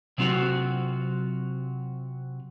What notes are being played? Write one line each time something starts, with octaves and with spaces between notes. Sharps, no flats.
C3 F#3 C4 F4 F#4